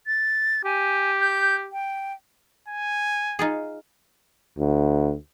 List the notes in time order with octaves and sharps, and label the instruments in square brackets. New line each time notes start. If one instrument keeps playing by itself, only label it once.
[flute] A6
[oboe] G4 [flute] G#5
[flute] G6
G5
[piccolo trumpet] G#5
[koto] D#4 F4 G#4
[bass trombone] D2